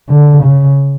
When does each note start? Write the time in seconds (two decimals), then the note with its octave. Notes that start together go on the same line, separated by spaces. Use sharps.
0.09 D3
0.43 C#3